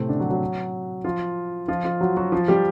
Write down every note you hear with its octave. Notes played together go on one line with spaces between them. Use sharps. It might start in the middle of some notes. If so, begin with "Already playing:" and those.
Already playing: A2 C3 A3 C4
D3 D4
F#3 F#4
F#3 F#4
F3 F4
F3 F4
F3 F4
F#3 F#4
F#3 F#4
F3 F4
G3 G4